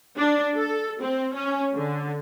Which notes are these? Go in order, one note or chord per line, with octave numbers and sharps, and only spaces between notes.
D4
A4
C4
C#4
D3